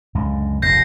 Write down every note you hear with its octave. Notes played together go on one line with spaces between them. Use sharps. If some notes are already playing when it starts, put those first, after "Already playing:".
C#2 F#2 D3
F1 A#1 D#2 G6 A#6 C7